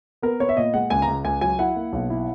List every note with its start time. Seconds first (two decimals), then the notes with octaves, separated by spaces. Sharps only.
0.22 B3 A#4
0.40 B3 C#5
0.49 E5
0.57 A#2 D#5
0.74 G#3 F#5
0.90 C#2 G#5
1.02 A#5
1.07 C#2
1.24 C#2 G#5
1.41 F#3 G#5
1.59 E4 F#5
1.76 A#3
1.92 B1
2.10 E4